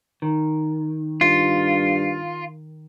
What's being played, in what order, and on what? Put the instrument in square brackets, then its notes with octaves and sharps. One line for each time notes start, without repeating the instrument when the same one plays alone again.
[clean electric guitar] D#3
[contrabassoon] G2 [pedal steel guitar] F4